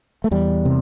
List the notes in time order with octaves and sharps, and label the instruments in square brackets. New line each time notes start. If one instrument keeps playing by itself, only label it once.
[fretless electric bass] A3
E2 G3
C3